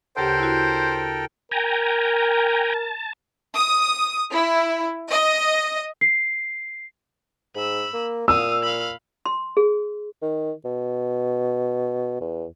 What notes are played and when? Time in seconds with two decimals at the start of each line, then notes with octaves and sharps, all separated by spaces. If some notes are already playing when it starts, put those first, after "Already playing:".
0.17 D2 C#3 G4 A4 A#4 C5 G5
0.39 E4 F#4
1.51 A#4 G5 G#5 A#5
2.74 A5
3.54 D#6
4.32 E4
5.11 D#5
6.01 C7
7.56 G#2 B5 E6
7.94 A#3
8.28 A#2 F5 D#6 E6
8.63 F5 B5
9.26 C6
9.57 G#4
10.22 D#3
10.65 B2
12.21 E2